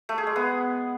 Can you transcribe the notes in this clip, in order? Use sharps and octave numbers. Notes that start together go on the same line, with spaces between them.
A3
G#4
G#3
B3